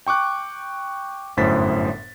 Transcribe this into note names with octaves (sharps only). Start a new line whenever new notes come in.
G5 C#6 D6 F#6
G1 F#2 A2 C5 A6 B6